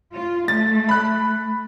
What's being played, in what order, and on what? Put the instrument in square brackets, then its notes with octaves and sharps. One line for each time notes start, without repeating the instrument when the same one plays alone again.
[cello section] F4
[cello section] A3 [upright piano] A6
[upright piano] B5 F#6